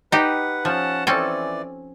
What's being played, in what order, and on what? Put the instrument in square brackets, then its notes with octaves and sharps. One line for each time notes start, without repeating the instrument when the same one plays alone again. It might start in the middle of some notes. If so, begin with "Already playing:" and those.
[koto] D#4 G4 [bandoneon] B4 F#5
[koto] F3 [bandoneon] C#4 F#5 A5
[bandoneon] E3 D5 [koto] C4 C#4 A4